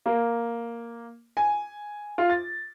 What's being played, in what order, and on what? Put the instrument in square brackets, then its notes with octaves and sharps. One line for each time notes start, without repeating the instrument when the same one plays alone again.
[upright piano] A#3
G#5
F4
A6